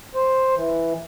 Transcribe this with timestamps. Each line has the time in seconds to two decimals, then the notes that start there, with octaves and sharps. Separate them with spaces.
0.14 C5
0.55 E3